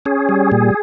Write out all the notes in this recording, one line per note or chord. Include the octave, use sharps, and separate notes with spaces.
C#4 G#4
G3
A#2